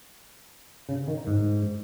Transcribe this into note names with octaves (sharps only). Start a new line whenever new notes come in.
C#3
D#3
G#2